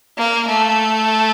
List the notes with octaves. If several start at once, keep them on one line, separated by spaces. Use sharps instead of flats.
A#3
A3